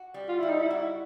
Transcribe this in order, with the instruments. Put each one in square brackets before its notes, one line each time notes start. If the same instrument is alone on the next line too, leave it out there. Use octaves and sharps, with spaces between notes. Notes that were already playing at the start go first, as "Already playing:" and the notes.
Already playing: [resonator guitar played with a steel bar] F#4
G3
[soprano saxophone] F4
[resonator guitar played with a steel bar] G3 [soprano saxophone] E4
[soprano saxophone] D#4
E4
[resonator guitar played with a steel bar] F#4